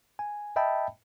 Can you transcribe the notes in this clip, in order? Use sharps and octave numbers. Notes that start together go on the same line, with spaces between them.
G#5
D#5 E5 G5 A5 B5